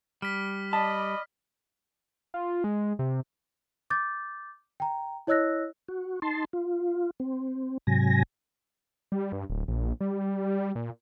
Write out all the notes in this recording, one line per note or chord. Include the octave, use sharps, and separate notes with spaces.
G3 F6 B6
D5 D#5 A5 B5
F4
G#3
C3
D6 G6 A6
G5 A#5
E4 C#5 D#5 E6 F#6 A#6
F#4
D#4 A5 C6
F4
C4
G#2 C3 F#3 G#5 A#6
G3
G2
D1
A#1
G3
A#2